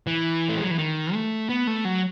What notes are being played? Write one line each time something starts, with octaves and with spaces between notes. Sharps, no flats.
E3
A3
G#3
F#3
E3
D#3
A3
B3
A3
F#3